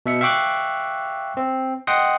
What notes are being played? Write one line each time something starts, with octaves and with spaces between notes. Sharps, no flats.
B2 E5 C#7
E5 F5 G5 C#6 D6 F#6
C4
D#5 F#5 G5 C6 D#6